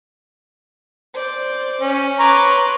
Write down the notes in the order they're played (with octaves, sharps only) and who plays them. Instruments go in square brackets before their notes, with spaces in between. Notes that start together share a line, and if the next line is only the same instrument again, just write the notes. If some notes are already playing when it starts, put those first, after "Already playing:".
[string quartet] C5 D5
[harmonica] C#4
[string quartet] B4 C6 D6 [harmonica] C#5 A#5